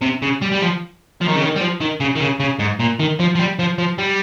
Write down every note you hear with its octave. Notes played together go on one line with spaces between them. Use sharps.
C3
C#3
G3
G3
F3
F3
D#3
C#3
D#3
G3
F3
D#3
C#3
D#3
C#3
C#3
G#2
A#2
D#3
F3
F3
G3
F3
F3
G3